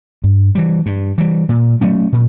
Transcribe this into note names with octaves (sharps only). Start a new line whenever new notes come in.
G2
E3 G3
G2
E3 G3
A#2
F#3 A3 C#4
A#2